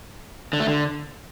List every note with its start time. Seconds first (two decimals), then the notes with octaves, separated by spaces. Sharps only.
0.53 D3
0.60 A3
0.67 D3